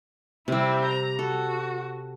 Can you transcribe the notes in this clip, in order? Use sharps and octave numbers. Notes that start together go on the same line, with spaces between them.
C3 G3 C4 E4
A#5
F#4 A4